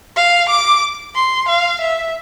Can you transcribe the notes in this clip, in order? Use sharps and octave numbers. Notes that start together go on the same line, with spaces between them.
F5
D6
C6
F5
E5